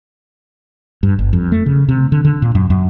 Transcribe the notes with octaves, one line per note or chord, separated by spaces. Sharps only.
G2
G1
F2
A3
C#3
C3
D3
D3
A#2
F#2
F#2